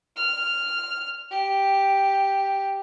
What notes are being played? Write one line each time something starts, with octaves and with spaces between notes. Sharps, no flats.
F6
G4